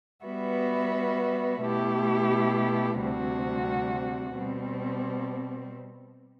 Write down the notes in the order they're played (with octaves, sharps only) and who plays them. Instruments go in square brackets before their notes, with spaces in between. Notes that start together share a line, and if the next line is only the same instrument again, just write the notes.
[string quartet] G3 B3 F#4 B4 E5
B2 A3 E4 G4
D2 C3 G3 C4 F#4
B2 G3 C4